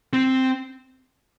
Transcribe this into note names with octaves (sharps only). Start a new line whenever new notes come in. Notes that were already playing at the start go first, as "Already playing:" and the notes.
C4